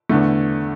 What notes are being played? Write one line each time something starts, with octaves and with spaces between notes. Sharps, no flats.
E2 D3 A3